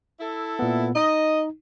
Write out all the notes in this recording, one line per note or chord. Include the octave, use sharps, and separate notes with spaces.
E4 A4
A#2 B3
D#4 D#5